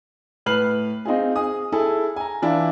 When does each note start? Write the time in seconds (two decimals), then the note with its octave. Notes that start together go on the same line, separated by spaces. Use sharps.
0.46 A2 B4 F6 C7 F#7
1.05 C4 D#4 F4 G#4
1.36 G#4 D#6
1.72 E4 G#4 A4
2.16 G#5 A#5
2.42 E3 D4 E4 F4